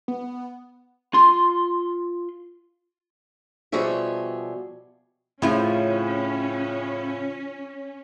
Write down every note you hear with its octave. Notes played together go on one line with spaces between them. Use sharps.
B3
F4 C6
B2 F3 G3 G#4 C#5 E5
A2 C#3 F3 C#4 E4 F4